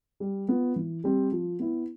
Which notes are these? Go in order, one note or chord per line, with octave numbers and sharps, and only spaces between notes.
G3
B3 F4
E3
G3 C4 G4
F3
B3 E4